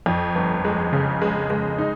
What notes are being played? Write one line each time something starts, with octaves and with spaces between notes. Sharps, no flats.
F2
G1
G#3
C#3
G#3
G#3
D#4